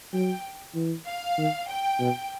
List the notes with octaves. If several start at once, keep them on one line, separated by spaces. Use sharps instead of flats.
F#3 G5
E3
F5
D#3
G5
B2